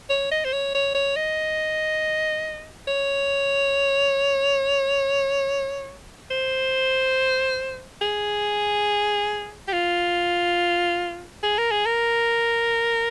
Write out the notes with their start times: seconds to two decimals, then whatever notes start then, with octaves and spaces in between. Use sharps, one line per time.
0.10 C#5
0.31 D#5
0.45 C5
0.53 C#5
0.75 C#5
0.95 C#5
1.16 D#5
2.88 C#5
6.31 C5
8.02 G#4
9.68 G4
9.73 F4
11.43 G#4
11.58 A#4
11.71 G#4
11.86 A#4